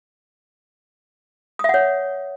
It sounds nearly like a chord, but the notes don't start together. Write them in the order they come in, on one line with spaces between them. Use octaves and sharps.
D#6 E5 F#5 C#5